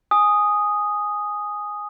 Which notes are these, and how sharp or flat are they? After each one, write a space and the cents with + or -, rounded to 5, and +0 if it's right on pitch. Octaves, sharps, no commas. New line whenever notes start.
G#5 +0 D#6 +0